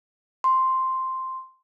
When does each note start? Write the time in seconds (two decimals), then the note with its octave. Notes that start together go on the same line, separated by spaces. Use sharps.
0.44 C6